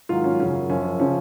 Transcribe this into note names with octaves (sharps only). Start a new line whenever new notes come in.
G#2 D#3 F#3 F4
C#4
F#2 C#3 F#3 C#4
F#2 F3 C#4
C#3 F3 C#4